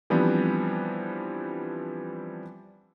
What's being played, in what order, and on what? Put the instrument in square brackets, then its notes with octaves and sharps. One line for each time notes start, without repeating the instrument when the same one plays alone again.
[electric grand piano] E3 F3 G3 B3 C4 D4